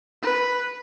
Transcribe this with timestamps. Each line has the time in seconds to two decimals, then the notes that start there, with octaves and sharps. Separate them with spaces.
0.22 B4